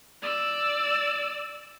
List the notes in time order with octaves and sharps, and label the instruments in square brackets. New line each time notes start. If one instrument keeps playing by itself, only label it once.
[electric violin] D5 E6